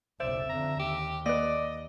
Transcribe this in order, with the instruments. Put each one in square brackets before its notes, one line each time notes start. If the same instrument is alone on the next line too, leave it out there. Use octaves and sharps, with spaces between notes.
[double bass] F#1 B1 [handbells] C5 [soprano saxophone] D5 [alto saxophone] E5
[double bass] F2 D3 [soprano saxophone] A#5
[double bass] D#2 [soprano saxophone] G4
[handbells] A#3 B4 [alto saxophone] D5 [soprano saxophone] D#5